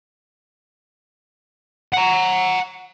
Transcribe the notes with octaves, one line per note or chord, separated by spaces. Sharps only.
F#5 A#5